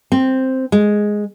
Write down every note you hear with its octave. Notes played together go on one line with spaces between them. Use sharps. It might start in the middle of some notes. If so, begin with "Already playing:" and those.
C4
G#3